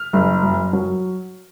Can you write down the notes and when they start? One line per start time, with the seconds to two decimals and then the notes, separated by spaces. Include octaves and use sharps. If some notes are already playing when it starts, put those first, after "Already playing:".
Already playing: F6
0.13 F#1
0.43 F#2
0.73 F#3